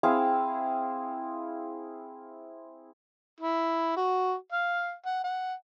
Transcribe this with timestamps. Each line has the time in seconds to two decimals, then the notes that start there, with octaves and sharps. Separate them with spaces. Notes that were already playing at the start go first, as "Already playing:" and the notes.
0.03 C4 E4 G#4 F5
3.40 E4
3.97 F#4
4.52 F5
5.06 F#5
5.24 F#5